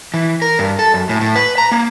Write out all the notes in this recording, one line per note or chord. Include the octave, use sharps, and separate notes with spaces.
E3
A#4
G2
A4
F#2
A2
A2
B4
A#5
A#3